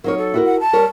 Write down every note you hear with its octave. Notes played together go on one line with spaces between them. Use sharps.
F#3 D#4 A#4 C#5
A4
E4 F#4 A#4
F#5
A5
G3 A#4 C#5